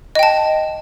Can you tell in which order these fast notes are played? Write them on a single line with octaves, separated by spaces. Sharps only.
D#5 G5 A5